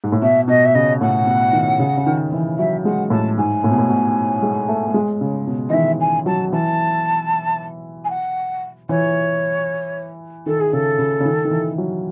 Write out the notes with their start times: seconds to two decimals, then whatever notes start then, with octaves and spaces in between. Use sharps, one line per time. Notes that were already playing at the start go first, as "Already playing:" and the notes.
0.04 G#2
0.12 A2
0.22 B2 E5
0.48 B2 D#5
0.65 E5
0.74 C#3 D#5
1.01 A2 F#5
1.27 B2
1.53 D#3
1.79 C#3
1.97 C#3
2.06 D#3
2.33 E3
2.58 F#3 E5
2.85 G#3 F#5
3.10 A2 A5
3.37 G#2 G#5
3.64 A2
3.71 B2
3.78 A2
3.90 B2
4.42 G#3
4.69 A3
4.87 A3
4.94 G#3
5.21 C#3
5.47 B2
5.69 E3 D#5
5.73 D#3 E5
6.00 G#5
6.26 F#3 A5
6.52 E3 A5
8.04 G#5
8.10 F#5
8.89 E3 C#5
10.46 D#3 A4
10.60 G#4
10.73 C#3 A4
10.99 C#3
11.20 C#3
11.25 D#3
11.45 D#3
11.51 E3
11.78 F#3